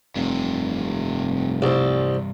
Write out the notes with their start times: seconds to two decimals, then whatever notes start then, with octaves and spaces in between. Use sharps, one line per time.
0.16 F1 G2 C3
1.62 C2 C5 D5